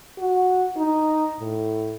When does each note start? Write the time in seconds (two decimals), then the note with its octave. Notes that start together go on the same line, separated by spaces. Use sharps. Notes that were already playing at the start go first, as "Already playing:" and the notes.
0.19 F#4
0.77 D#4
1.40 A2